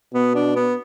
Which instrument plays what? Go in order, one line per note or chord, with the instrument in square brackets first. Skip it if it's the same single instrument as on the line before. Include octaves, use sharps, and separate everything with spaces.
[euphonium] B2 [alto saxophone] B3
[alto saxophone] D4
B3